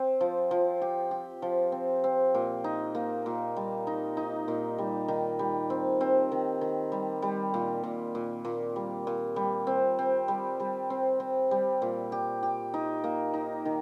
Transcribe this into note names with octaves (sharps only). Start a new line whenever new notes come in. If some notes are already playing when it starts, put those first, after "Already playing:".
Already playing: C4
F3
F3
G4
G4
F3
C4
C4
A#2
D#4
A#3
A#2
G3
D#4
D#4
A#2
G3
D#3
G3
C4
C4
D#3
D#3
G3
G3
A#2
A#2
A#2
A#2
G3
A#2
G3
C4
C4
G3
G3
C4
C4
G3
A#2
G4
G4
D#4
A#3
D#4
D#3